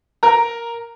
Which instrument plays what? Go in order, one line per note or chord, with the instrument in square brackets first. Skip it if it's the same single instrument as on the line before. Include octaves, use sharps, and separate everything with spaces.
[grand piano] A#4 A#5